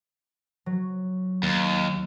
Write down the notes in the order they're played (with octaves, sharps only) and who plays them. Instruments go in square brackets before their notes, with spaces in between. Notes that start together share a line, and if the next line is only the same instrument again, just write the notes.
[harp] F#3
[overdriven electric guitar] D#2